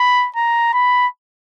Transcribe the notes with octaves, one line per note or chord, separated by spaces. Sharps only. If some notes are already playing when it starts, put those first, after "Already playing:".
Already playing: B5
A#5
B5